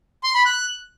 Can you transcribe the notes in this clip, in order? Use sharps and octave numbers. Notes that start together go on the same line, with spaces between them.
C6
B5
F#6